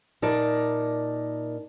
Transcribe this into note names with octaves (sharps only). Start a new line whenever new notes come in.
A#2 D#4 A#4 D5 A5